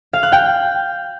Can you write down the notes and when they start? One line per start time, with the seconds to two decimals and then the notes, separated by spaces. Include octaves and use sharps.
0.13 F5
0.23 F#6
0.32 G5